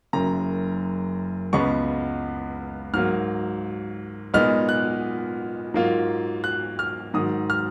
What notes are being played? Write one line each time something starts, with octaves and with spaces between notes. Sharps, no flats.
F#1 F#2 C#3 A#5
C#2 C#3 G#3 B3 C#6
G#2 F#3 A#3 F6
A#2 G#3 B3 D#4 F6
F#6
G#2 F#3 A#3 F4
F#6
F6
G#2 D#3 F#3 D#6
F6